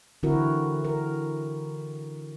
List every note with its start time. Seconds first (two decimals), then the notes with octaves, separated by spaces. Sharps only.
0.23 D3 E3 C4 E4 F#4 A#4
0.85 A#4